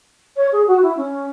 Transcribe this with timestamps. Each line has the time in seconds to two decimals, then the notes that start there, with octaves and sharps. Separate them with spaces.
0.36 C#5
0.52 G#4
0.67 F#4
0.82 E4
0.97 C#4